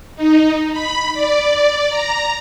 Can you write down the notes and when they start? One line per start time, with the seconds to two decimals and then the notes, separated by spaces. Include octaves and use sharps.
0.16 D#4
0.72 B5
1.14 D5
1.90 A#5